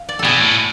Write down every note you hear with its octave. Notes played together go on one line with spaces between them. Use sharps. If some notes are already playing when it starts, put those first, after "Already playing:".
Already playing: F5
D5
A4
B2 G#4
A2